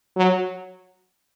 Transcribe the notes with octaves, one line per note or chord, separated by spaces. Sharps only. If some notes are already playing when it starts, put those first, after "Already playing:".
F#3